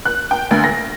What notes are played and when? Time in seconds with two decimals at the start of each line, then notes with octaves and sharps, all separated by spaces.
0.05 F#6
0.31 G5
0.51 D2
0.64 A#6